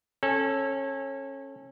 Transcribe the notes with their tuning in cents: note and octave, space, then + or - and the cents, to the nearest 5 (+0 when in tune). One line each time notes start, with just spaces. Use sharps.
C#4 -25 A4 +0